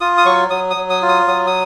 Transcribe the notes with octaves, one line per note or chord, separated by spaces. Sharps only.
F4 D#6
D#6
F#3 C#6
F#3 D#6
D#6
F#3
D#6
F4
D#6
F#3 D#6
D#6